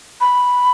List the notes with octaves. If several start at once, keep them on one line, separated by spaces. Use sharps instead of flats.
B5